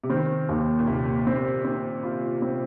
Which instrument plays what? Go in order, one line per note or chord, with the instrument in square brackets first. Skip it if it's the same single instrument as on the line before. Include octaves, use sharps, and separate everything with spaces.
[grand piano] C3
[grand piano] D#3 [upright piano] C4
[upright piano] D#2
[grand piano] A#2
[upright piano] D#2 [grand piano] C3
[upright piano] C4
C4
F4
C4